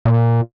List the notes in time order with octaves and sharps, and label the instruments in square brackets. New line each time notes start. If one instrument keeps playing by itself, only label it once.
[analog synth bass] A#2